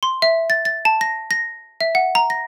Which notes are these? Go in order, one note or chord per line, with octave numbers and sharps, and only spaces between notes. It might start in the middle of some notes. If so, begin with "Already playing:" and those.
C6
E5
A6
A6
A5
A#6
A#6
E5
F#5
A#5
A#6